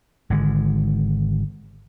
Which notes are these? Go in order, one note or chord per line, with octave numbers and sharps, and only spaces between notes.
G#1 D3 G#3